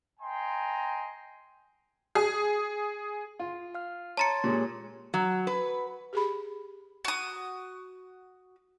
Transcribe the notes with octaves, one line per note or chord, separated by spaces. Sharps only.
D#5 G5 G#5 A#5 C6
G#4
F4
F5 F6
C#5 A5 A#5 C6 A6 C#7
A#2 G#3 G4 C#5
F#3
B4
G4 G#4 B5
F#4 D#6